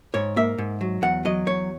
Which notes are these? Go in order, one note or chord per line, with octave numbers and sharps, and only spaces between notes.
G#2 C#5
A#3 E5
G#2
F#3
E2 F#5
F#3 D#5
E2 C#5